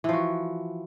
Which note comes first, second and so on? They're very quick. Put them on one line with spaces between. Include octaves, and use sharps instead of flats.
E3 F3 F#4